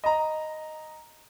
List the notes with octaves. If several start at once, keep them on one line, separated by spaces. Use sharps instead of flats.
D#5 A#5